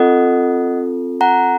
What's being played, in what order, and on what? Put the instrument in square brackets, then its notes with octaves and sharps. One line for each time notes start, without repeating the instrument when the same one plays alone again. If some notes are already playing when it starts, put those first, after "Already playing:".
Already playing: [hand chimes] C4 F4 A4 D#5 F#5
F#5 A#5